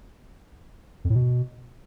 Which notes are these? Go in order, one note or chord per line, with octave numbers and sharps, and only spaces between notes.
F2
A2
B2